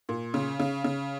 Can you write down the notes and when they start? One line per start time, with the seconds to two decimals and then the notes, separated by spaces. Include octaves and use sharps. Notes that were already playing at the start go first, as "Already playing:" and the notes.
0.09 A#2
0.34 C#3
0.60 C#3
0.84 C#3